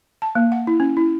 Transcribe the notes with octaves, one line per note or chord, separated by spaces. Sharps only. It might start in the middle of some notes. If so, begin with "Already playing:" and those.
A5
A#3
F#5
E4
C#4
E4